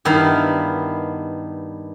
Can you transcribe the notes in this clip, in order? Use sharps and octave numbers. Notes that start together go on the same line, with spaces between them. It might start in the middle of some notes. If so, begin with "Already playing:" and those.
G2 D#3 B3 E4 F5 B5